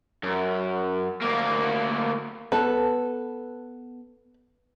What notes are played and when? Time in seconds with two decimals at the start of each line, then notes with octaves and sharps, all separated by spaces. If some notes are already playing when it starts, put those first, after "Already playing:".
0.23 F#2
1.21 D2 A#3
2.52 B3 A4 B4